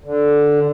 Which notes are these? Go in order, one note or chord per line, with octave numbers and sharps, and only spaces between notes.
D3